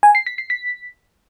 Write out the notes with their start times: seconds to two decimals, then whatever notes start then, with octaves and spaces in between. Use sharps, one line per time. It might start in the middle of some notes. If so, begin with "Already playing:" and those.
0.03 G#5
0.15 C7
0.26 B6
0.38 C7
0.50 B6